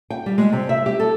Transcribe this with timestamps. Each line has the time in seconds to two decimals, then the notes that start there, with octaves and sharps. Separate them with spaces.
0.10 G5
0.26 G3
0.38 G#3
0.52 C3
0.69 E5
0.86 G4
1.00 A4